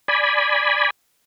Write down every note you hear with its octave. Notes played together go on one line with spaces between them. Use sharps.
D5 G#5 B5